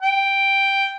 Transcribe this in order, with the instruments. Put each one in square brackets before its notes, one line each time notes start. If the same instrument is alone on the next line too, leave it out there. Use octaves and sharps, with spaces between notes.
[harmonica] G5